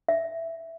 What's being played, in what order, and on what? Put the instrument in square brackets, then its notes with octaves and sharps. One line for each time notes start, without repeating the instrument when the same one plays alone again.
[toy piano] E5